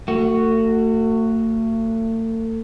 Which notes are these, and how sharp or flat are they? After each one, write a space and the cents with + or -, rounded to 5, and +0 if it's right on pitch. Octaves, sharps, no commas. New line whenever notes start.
A3 +40 F#4 +5